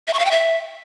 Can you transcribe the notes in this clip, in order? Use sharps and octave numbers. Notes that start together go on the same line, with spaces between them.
E5
C#6
F5
G5
E5